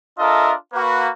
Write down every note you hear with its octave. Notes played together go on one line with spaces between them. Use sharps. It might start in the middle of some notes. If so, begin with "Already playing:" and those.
D4 F4 A4 A#4 D#5 E5
A#3 F#4 B4